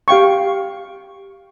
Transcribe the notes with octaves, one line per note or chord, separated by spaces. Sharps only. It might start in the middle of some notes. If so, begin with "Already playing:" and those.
G4 F5 G5 C#6